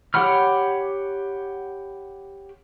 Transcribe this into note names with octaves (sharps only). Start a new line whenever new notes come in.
G4 C#5 F#5 B5 F6